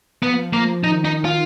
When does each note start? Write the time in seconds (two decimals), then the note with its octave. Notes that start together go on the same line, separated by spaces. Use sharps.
0.22 F3 B3
0.53 A#3
0.83 D#3 D#4
1.05 D#4
1.25 F4